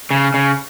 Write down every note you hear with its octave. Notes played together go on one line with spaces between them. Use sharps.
C#3
C#3